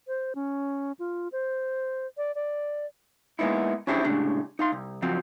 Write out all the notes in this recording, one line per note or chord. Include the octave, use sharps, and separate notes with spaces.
C5
C#4
F4
C5
D5
D5
G#3 A#3 B3 D#4 E4
C#4 D4 E4 G4 G#4 C5
C2 A2 C#3 G#3 D4 G4
D#4 F5 C6
C2
C#3 F3 F#3 C4